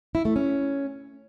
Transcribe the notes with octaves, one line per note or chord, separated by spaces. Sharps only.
E4
A3
C#4